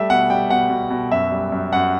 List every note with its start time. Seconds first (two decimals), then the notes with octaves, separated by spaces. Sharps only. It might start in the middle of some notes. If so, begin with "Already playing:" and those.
Already playing: G3 A3 E5
0.10 B2 F#5
0.30 G3 G5
0.50 B2 F#5
0.70 B2
0.90 B2
1.11 F#2 E5
1.31 G3
1.52 F#2
1.73 F#2 F#5